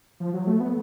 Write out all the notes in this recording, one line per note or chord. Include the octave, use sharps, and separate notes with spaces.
F3
F#3
A3
B3